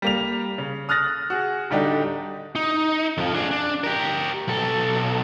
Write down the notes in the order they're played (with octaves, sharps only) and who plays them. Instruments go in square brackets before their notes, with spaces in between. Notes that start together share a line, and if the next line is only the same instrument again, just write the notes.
[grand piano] G3 A#3 F7
C#3
D#6 F6 F#6 A6 A#6
F#4 G#4
D1 D3 G3 D4 D#4 G4
[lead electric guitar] D#4
F2 F3
D4 G#4
D4
G4 A#4
B1 A4